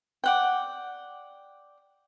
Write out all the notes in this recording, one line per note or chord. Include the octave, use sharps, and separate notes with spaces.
D5 F#5 G5